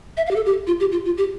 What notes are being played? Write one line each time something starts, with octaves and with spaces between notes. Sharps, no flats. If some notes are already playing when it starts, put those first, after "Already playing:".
E5
F5
G4
A4
G4
F4
G4
F4
F4
G4